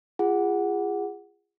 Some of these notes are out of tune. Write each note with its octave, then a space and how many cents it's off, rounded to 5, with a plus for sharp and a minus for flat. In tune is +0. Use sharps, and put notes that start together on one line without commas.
F4 -25 G#4 -25 F#5 +0